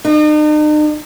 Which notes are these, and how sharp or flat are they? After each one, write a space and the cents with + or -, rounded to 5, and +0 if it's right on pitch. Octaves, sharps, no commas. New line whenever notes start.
D#4 -45